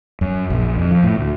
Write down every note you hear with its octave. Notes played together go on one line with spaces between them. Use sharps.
F#2
A#1
F2
F3
A2
D2